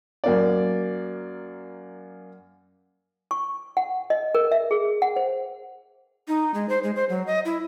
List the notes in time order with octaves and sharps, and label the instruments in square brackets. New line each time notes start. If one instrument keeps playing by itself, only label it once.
[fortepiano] F#2 A#3 D5
[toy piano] C#6
F#5
D#5
A#4
E5
G#4
F#5
C5
[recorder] D#4
G#3
C5
G#3
C5
F#3
D#5
E4